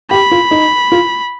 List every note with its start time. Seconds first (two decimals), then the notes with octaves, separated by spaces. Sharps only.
0.11 G4 B5
0.31 F4
0.51 D#4
0.92 F4